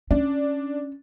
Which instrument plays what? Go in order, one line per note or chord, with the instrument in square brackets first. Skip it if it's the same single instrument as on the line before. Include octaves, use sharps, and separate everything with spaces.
[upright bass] C#4 [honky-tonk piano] D4